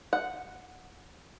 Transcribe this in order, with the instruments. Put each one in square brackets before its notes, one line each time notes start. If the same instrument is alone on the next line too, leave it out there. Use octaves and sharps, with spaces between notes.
[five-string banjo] F#5